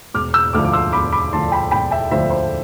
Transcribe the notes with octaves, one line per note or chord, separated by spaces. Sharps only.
E1 D6 F6
E6 G6
D2 D3 F3 D6 F6
D6
C6 E6
E1 B5 D6
B5 D6
D2 D3 F3 A5 C6
G5 B5
E1 G5 B5
E5 G5
D2 D3 F3 C5 E5
C5